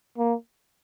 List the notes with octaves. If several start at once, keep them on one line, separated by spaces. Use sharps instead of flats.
A#3